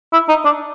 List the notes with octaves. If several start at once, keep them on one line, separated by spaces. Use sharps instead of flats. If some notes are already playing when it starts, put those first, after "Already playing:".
E4
D#4
D4